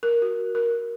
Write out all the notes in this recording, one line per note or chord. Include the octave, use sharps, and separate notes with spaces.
A#4
F#4
A#4